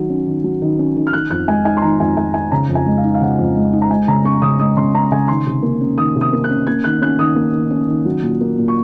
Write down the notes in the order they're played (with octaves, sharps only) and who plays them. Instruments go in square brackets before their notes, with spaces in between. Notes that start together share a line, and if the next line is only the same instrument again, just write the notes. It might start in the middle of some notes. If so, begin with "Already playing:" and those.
Already playing: [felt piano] D#3 F#3
C#4
D#3
F#3
D#3
C#4
D#3
F6
D#3 F#6
F2 F#6
G#3 G#5
D#4 G#5
C6
D#3 A#5
F2 G#5
G#3 G#5
D#4 G#5
C#3 A#5
F2
G#5
G#3
F5
D#4
F5
C#3 F#5
F2
G#3
D#4
A#5
G#3 G#5
C#3 A#5
C#4 C#6
C#3 D#6
G#3 D#6
C#3 C6
C#4 A#5
C#3 G#5
D#3 C6
C3
A#3
C#4
D#3 D#6
C3
D#6
A#3
F#6
C#4
A#3 G#6
D#3 F#6
C#4 F#6
D#3 D#6
A#3
D#3
C#4
D#3
F#3
A#2
A#3
A#2
C#6